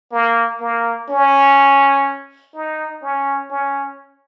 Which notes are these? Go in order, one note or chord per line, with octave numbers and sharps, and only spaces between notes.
A#3
A#3
C#4
D#4
C#4
C#4